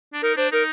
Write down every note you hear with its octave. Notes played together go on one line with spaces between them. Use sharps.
D4
D#4 A#4
D4 C5
D#4 A#4